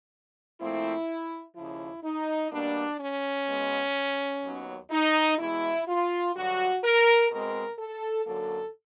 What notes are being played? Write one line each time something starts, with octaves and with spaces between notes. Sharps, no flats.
A#2 F3 A3 C4 E4
D#2 C#3 F3 E4
D#4
B2 G3 A#3 D4
C#4
B2 G#3 B3
D#2 D#3 F#3 B3
D#4
E2 B2 G#3 E4
F4
G2 D3 F#3 F#4
A#4
B2 G#3 C4 A#4
A4
F#2 D3 F#3 A#3 A4